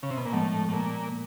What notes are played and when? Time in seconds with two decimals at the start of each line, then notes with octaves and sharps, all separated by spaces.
0.03 C#3
0.10 C3
0.17 B2
0.25 A#2
0.33 A2 F3 G#3 B3
0.69 A2
0.73 A#2